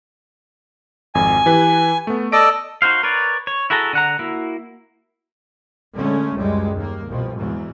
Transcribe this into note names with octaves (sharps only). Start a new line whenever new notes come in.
G#1 F2 G#5
E3 G4 B4
A3 B3
A4 D5 D#5 A#6 D7
D#4 F#4 C5 F5
A#4 B4 C#5 D5
C#5
E4 F#4 G#4 A4 A#5
D3 F#5 A#5
A#3 E4 F#4
D3 G#3 A3 C#4
C#2 F#2 G3 G#3
D#2 A#3
C2 B2 F3
E2 G#2 F#3